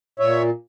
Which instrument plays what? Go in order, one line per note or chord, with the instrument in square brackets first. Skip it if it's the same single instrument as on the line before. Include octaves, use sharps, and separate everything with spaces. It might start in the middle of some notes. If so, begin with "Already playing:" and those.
[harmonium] A#2 C#5 E5